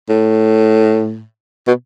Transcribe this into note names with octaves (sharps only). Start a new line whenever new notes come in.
A2
B2